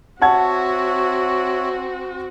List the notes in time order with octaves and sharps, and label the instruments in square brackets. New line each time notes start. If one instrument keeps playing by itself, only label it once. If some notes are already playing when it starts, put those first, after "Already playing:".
[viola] C4 F#4 [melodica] C#5 E5 [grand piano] F#5 A5 G#6